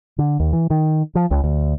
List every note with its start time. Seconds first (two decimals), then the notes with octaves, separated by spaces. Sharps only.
0.19 D3
0.40 D#2
0.53 E3
0.70 D#3
1.15 F3
1.31 C#2
1.44 D2